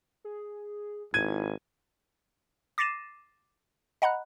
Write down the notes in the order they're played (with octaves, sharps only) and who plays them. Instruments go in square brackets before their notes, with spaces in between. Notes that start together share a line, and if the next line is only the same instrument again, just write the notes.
[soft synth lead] G#4
[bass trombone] G#1 [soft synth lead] E4 [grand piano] G#6 D#7
[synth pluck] D6 A6 A#6 C7 D#7 E7
D#5 F#5 A#5 B5 F#6